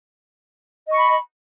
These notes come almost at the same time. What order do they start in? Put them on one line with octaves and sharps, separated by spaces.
D#5 C#6 B5